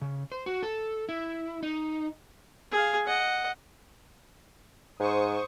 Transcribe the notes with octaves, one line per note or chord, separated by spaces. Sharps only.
C#3
C5
F#4
A4
E4
D#4
G#4 F5
D#5 F#5
G#2 C5 C#6 D#6